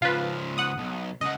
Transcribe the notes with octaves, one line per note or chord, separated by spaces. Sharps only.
C#2 F3 F4 B4
F#5 D#6
B1
C#2 D#5 F#5